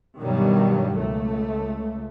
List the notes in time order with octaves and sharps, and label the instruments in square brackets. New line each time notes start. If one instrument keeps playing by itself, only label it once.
[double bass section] G2 B2 D#3 F#3 G3
C#2 A3